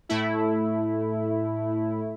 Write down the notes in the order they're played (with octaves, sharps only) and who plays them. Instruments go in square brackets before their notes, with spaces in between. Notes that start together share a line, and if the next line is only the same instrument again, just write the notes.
[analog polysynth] A2 A3 E4